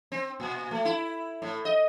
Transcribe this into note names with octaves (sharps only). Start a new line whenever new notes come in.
C4
A#2
A3
E4
A2
D#5